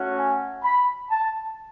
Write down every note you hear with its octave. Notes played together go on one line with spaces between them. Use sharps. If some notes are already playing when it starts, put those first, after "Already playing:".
Already playing: A3 C#4 F#4
G#5
B5
A5